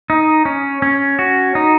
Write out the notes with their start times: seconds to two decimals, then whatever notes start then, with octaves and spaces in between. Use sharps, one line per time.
0.10 D#4
0.45 C#4
0.82 C#4
1.19 F#4
1.55 D#4